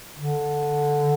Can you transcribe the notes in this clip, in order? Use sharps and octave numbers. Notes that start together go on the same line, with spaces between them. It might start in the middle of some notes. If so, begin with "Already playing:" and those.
D3